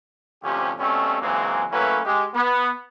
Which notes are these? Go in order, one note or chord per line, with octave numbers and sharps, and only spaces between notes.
D2 C3 F3 C#4 G4
B2 G3 A3 C4 C#4
C#2 E3 F#3 G#3 A#3 C4
F#3 A3 A#3 C#4 E4 B4
G#3 G4
B3